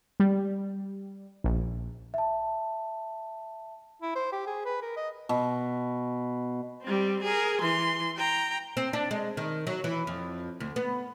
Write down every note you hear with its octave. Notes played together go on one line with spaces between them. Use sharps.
G3
A#1
E5 A5
E4
C5
G4
G#4
B4
A#4
D#5
B2
G3 C4
G#4 A#4
E3 C6
G5 A#5
C4
D4
G#3
D#3
F#3
E3
F2
D2
B3